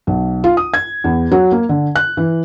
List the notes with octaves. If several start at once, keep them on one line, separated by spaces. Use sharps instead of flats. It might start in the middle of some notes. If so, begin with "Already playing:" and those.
B1
F4
D#6
G#6
E2
F#3
A#3
D3
F#6
E3